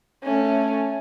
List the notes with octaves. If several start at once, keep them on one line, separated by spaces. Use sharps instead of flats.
A3 C#4